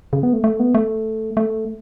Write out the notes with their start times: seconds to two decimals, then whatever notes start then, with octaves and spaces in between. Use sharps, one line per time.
0.13 C#3
0.23 B3
0.33 A3
0.44 A3
0.60 B3
0.75 A3
1.37 A3